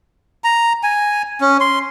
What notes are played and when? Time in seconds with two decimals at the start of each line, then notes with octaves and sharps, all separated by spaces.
0.44 A#5
0.83 G#5
1.41 C#4
1.61 C6